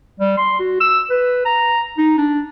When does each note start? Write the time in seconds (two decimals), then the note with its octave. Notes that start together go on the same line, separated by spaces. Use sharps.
0.20 G3
0.37 C6
0.59 F#4
0.80 E6
1.10 B4
1.45 A#5
1.98 D#4
2.18 D4